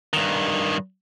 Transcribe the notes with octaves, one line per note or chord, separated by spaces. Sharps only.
G2 D#3